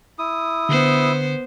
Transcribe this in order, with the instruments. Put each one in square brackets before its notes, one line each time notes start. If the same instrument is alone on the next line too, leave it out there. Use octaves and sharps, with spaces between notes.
[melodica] E4 D#6
[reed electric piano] D3 [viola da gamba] B3 C5